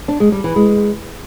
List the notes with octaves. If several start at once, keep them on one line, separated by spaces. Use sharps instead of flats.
D4
G#3
G3
E3
G#3